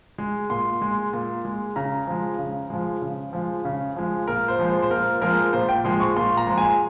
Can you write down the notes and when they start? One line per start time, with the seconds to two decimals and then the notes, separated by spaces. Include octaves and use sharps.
0.18 G#3
0.50 A#2 C6
0.82 G#3
1.13 A#2
1.45 G#3
1.76 C#3 A#5
2.07 F3 G#3
2.39 C#3
2.70 F3 G#3
3.02 C#3
3.33 F3 G#3
3.65 C#3
3.96 F3 G#3
4.27 A#2 A#4
4.48 C5
4.59 F3 G#3
4.69 C5
4.82 C5
4.91 A#2 A#4
5.22 F3 G#3 A#4
5.53 A#2 C5
5.69 G5
5.85 F3 G#3 C6
6.00 C#6
6.16 A#2 C6
6.37 A#5
6.47 F3 G#3
6.58 G#5